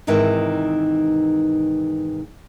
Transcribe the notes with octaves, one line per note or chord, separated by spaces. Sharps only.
G#2 C3 D#3 E3